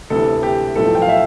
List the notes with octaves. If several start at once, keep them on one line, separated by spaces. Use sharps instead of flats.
D2 C3 E3 A4
G4
B1 A2 F3 A4
G5
F5
E5